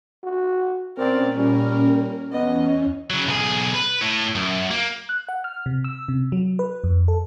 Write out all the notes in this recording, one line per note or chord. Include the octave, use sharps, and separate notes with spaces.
F#4
A#2 C4 C#4 A#4 D5
G3 A#4
E2 B3 C#4 D#5
C#3 F#3
B1 G#4
B4
A2
F#2
A#3
F#6
F#5
F6
C3
E6
C3
F#3
B4
F2
A4